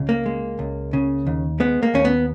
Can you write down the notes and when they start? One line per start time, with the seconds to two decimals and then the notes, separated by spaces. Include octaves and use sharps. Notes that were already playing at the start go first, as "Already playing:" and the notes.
Already playing: C#2 C#3
0.09 A#3
0.26 G#3
0.59 C#2
0.93 C#3
1.27 D#2
1.60 G#3 B3
1.83 A#3
1.94 D#2 C#4
2.05 B3